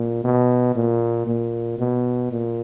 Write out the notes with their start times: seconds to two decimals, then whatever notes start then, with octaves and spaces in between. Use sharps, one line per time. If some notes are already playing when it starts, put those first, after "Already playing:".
Already playing: A#2
0.24 B2
0.76 A#2
1.27 A#2
1.79 B2
2.31 A#2